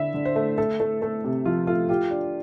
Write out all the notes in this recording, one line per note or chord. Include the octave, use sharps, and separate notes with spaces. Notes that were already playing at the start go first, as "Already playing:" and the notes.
Already playing: D3 E4 E5
D3
C5
A3
A3 A4
A3
A3
C3
F3 F4
A3 F4
F4 G4
D4